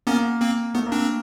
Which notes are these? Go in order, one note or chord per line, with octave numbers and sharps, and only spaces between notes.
A#3 B3 C#4
A#3 C4
A3 B3
A#3
C4 D4